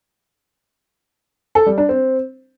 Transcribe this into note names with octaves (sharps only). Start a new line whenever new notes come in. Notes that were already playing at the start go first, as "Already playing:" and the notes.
A4
G3
D4
C4